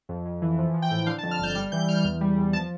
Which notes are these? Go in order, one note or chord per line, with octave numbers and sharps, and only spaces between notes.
F2
F2
E3
F3
F3
G5
A2
D3 F5
A5
F2
F6
G1 G6
G3 F6
E3 G6
G3 F6
E2
G3
E2
F3 A5